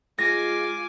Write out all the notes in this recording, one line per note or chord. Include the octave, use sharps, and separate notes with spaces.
G#3 F4 G#5 D6 A#6